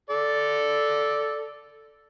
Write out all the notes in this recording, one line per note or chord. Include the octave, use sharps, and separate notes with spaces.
A4 D5